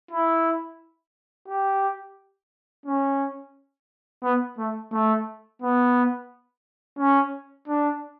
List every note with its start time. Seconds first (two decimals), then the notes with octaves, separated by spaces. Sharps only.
0.11 E4
1.48 G4
2.86 C#4
4.23 B3
4.58 A3
4.92 A3
5.62 B3
6.99 C#4
7.68 D4